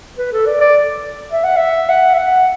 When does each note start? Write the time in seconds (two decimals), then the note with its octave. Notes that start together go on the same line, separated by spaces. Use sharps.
0.18 B4
0.33 A4
0.46 D5
0.61 D5
1.32 E5
1.44 F#5
1.57 E5
1.89 F#5
2.14 E5
2.18 F#5